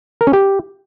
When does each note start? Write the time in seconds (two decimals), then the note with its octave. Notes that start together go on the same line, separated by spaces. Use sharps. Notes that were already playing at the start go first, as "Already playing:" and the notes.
0.21 A#4
0.27 C#4
0.33 G4